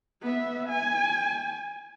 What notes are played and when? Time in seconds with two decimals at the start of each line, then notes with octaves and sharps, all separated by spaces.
0.22 B3 E5
0.69 G#5